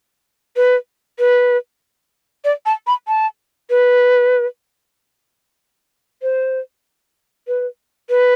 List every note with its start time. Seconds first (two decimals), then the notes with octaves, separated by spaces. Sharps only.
0.57 B4
1.19 B4
2.45 D5
2.66 A5
2.87 B5
3.08 A5
3.70 B4
6.22 C5
7.48 B4
8.10 B4